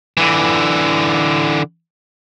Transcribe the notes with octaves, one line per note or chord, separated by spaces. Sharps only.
D3 E3